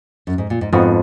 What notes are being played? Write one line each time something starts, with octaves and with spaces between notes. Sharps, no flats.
F#2
G#2
A#2
G#2
F2 G#2 F3 B3 F#4